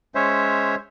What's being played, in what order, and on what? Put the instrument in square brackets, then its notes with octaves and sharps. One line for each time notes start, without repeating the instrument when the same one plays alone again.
[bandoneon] G#3 C#4 C5 C#5 E5